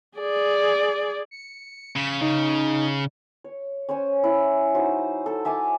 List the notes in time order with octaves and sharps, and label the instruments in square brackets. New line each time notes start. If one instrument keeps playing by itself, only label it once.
[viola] G#4 D5
[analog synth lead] C#7
[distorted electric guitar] C#3 [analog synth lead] B6
[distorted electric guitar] C#3 [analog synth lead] D#4
[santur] C#5
C#4 C5 C#5 G#5
E4 B5
F#3 D#4 C5
A4
E5 G#5 A5 D6